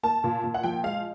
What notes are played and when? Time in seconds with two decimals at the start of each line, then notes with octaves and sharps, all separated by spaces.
0.03 A#3 A5
0.24 A#2
0.44 A#2
0.54 F#5
0.63 F3 G5
0.83 G#3 F5